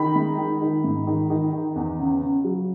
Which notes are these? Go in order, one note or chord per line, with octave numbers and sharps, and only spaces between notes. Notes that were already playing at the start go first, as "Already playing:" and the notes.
Already playing: D#3 B5
G#3
D#3
D#3
G#2
D#3
D#3
D#3
E2
C#3
C#3
F#3